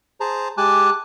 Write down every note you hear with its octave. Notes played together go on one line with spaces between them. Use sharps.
G#4 C5 A5 A#5
G#3 G4 G#5 A5 D6 F#6